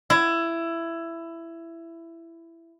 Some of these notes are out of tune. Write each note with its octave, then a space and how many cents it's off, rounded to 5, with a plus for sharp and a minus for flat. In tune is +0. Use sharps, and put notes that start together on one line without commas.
E4 +15